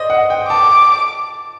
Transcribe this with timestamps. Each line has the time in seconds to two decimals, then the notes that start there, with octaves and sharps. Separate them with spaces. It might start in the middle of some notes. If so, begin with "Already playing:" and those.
Already playing: C5 D5 D#5
0.10 F#5
0.30 G5
0.49 A5 D6